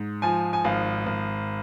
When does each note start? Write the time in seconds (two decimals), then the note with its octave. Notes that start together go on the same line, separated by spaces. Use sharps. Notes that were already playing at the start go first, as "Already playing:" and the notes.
Already playing: G#2
0.22 F3 G#5
0.53 G#5
0.64 G#1 F5
1.06 G#1